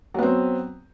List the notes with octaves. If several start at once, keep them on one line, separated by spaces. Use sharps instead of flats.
F#3 B3 C4